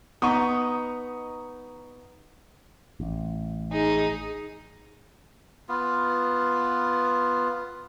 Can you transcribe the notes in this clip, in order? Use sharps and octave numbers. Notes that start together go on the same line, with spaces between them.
B3 D#4 A#5 C#6 D#6
A1
D#4 G#4
B3 F4